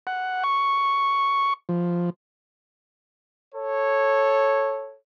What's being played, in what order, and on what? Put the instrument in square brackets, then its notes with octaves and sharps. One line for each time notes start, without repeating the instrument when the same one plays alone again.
[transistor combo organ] F#5
C#6
F3
[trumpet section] A4 C#5